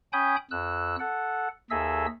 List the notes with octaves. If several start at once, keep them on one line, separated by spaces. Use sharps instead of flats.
C#4 G5 G#5 B5 D#6 G6
F2 E6 F#6
A4 F#5
D#2 G#4 A4 D#5 E5 E6